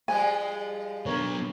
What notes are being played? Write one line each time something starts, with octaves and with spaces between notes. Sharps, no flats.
F3 G3 G#3 G#5
F#3 B3 D4 A#4 C#5